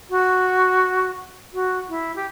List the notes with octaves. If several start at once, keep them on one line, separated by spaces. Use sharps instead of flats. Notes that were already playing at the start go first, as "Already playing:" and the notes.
F#4
F#4
E4
G4